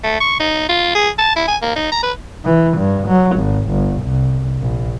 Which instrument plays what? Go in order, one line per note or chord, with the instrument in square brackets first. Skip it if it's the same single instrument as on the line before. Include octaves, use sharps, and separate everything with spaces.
[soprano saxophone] A3
C#6
D#4
F4
G#4
A5
E4
G#5
A#3
D#4
A#5
B4
[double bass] E3
G2
F#3
G#1
G1
C2
A#1